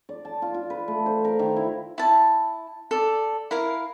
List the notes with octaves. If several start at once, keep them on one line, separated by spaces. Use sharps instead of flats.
D5
A5
F4
F4
B4
A3
C5
A#4
D#3
E4
E4 A5
A4 D5
E4 A#4 F5